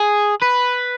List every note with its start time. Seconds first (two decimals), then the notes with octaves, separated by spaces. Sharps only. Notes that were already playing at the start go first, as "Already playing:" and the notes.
Already playing: G#4
0.42 B4